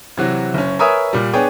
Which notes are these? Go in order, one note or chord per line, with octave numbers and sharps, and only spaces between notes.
C3 E3 F#3 F#4
F#1 C#4
A#4 B4 C#5 E5 G#5 D#6
A#2 G3
B3 D4 G#4 C#5 G5